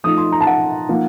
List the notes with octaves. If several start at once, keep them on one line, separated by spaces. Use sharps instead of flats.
F3 A3 D#4 D#6
C6
A#5
A5
F#5
F3 A#3 D#4